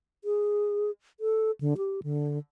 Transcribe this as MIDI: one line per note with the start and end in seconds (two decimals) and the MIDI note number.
0.24 0.91 68
1.20 1.51 69
1.61 1.74 50
1.77 2.01 67
2.03 2.39 50